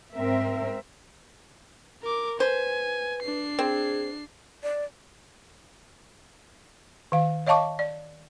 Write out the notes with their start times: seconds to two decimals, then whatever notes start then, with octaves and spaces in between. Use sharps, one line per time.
0.13 G#2 C4 A#4 E5
2.03 A#4 D6
2.40 B4 C5 G#5
3.23 D4 C7
3.59 C4 G#4
4.63 D5
7.12 D#3 F5
7.47 C#5 D#5 F5 A5 C#6 D6
7.79 D5